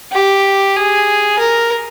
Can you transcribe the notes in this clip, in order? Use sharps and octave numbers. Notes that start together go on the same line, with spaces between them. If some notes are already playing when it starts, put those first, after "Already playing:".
G4
G#4
A#4